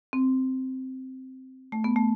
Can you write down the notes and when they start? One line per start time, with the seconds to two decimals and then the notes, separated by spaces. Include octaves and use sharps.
0.13 C4
1.72 A3
1.84 B3
1.96 A3